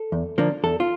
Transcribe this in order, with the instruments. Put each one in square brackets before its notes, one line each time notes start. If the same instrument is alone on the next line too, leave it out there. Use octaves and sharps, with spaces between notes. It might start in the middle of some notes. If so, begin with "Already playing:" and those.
Already playing: [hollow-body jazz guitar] A4
E2
D3 F3 A#3 D4
E2 A4
F4